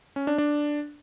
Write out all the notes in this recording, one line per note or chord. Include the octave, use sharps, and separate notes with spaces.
C#4
D4
D4